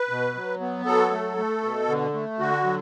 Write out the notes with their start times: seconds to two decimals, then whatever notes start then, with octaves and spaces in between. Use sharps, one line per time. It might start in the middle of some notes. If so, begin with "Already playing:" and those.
Already playing: B4
0.09 B2
0.34 F#3
0.60 B3
0.86 F#3 A4
1.11 A3
1.37 A3
1.63 B2
1.88 D3
2.14 A3
2.39 D3 F#4
2.64 F#3